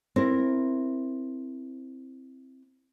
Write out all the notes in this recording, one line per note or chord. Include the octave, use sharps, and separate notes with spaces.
C4 E4 A#4